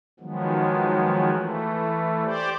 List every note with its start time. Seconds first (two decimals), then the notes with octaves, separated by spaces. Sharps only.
0.20 D#3 F3 F#3 G#3 B3
1.32 E3 A3
2.24 G4 C5 D5